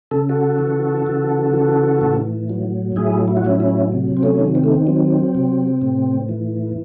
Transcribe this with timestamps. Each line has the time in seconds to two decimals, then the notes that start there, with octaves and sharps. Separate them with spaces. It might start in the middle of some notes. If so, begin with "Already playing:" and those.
0.11 C#3 A4
0.29 F#4 A4
0.59 E3
1.06 C#3
1.54 E3
2.01 A2
2.49 F#3
2.96 A2 E4 G#4
3.28 E4
3.37 F#4
3.44 F#3 C#4 E4
3.60 C#4 E4
3.92 C3
4.17 C4
4.23 A3 C#4
4.39 D#3
4.55 C4
4.64 A3
4.72 C4
4.87 F#3 C4
5.35 C3
5.82 A2
6.29 E3